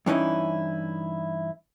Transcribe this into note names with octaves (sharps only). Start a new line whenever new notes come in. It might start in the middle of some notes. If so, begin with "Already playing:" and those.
G2 E3 C#4 D#4 E4